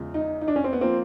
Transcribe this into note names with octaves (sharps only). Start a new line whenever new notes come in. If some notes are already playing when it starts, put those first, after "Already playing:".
Already playing: E2 C#3 F3 G#3
D#4
D#4
D4
C#4
C4
B3
F3 A#3 C4